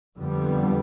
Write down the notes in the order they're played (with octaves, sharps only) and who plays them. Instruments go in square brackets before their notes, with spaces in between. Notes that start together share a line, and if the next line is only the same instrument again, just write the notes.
[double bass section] F2 D3 G3 B3